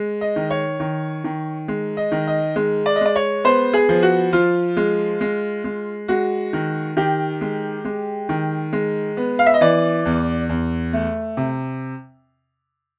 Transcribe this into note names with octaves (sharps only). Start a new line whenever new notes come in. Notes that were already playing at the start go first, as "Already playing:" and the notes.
Already playing: G#3
D#5
D#3
C#5
D#3
D#3
G#3
D#5
D#3
D#5
G#3
D5
D#5
G#3 D5
C#5
B3 C5
G#4
F3
F#4
F3 F4
G#3
G#3
G#3
G#3 F#4
D#3
D#3 G4
G#3
G#3
D#3
G#3
B3
F5
E5
D#5
E3 D5
E2
E2
A3
C3